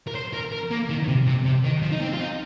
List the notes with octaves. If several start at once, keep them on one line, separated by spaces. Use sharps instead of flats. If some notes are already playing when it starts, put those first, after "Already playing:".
A#4
C5
A#4
A#4
A#3
D#3
C3
C3
C3
D#3
F3
D#4
C4
F4
D#4